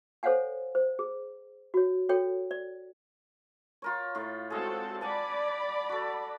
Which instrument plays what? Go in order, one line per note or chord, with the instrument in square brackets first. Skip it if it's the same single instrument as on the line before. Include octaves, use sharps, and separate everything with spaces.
[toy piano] A4 C5 C#5 F5 F#5 G#5
C5
G#4
F#4 C#5
F#4 A4 C#5 G5
D5
[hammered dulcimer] F4 A#4 C#5
A2 F4
[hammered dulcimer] G#3 G#4 [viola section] C4 F#4 A4
[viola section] D5 B5 [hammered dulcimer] F#5 G#5 A5
[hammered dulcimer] F#4 A4